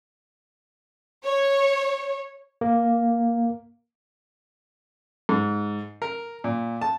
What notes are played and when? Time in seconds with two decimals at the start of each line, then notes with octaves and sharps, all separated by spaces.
1.24 C#5
2.61 A#3
5.29 G#2
6.02 A#4
6.44 A#2
6.82 A5